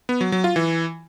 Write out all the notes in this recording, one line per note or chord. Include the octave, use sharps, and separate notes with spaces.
B3
F#3
F#3
F4
E3